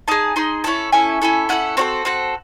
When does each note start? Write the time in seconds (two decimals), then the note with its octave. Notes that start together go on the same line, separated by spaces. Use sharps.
0.08 D#4 G#4 A5
0.36 D#4 G#4 C6
0.64 C#4 E4 A4 A5
0.92 C#4 E4 A4 G#5
1.22 C#4 E4 A4
1.49 C#4 E4 A4 F#5
1.77 C4 F#4 A4 C#5
2.05 C4 F#4 A4